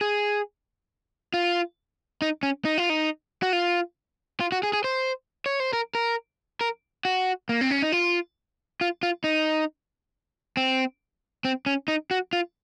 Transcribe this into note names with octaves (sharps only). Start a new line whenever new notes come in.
G#4
F4
D#4
C#4
D#4
F4
D#4
F#4
F4
F4
F#4
G#4
G#4
C5
C#5
C5
A#4
A#4
A#4
F#4
A#3
C4
C#4
D#4
F4
F4
F4
D#4
C4
C4
C#4
D#4
F#4
F4